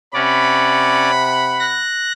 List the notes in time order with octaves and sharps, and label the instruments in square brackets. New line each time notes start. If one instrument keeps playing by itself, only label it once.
[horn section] C3 F#5 B5 [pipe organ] C#4 D5
[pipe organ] F#6 A#6